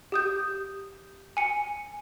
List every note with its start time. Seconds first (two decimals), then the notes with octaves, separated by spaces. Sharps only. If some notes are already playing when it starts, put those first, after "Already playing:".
0.12 G4 D#6 G6
1.37 G#5 C#7